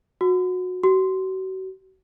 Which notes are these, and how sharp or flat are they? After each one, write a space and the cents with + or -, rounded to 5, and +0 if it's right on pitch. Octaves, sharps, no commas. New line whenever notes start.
F#4 -20
F#4 +35